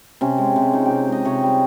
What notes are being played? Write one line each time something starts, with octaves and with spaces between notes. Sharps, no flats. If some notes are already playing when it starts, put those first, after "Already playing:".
C3 C#4
G#3
C3
F3 D#4
C3 G4
G#3 D#5
C3 C#5
G3